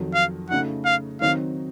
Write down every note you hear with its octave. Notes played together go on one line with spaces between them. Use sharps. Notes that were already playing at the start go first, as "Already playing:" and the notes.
Already playing: F2 D#3 F#3
F5
C#3 A3 D#4 F#4 F#5
F5
D#3 F#3 C4 D#4 F#4 F5